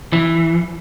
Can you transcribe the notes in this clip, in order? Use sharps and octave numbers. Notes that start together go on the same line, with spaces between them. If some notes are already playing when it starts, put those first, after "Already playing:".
E3